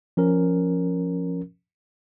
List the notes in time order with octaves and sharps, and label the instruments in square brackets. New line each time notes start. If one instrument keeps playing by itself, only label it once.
[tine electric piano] F3 C#4 A#4